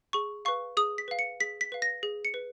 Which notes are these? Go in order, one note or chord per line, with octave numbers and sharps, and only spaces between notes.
G#4 C#6
B4 F5 C#6
G#4 D#6
B6
B4 F5
C#7
G#4 B6
B6
B4 F5
A#6
G#4
C#7
B4